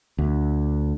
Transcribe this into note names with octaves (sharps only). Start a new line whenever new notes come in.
D2